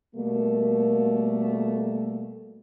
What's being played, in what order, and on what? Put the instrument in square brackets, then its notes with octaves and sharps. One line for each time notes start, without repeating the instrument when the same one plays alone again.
[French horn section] B2 G3 A3 A#3